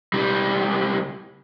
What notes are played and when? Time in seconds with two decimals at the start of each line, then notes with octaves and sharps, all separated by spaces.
0.14 C#2 G3